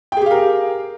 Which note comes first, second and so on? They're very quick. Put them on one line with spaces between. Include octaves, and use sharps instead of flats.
G5 G#4 G4 F5 A#4